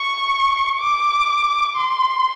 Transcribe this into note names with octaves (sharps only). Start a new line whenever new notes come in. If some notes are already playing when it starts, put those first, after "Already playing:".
Already playing: C#6
D6
C6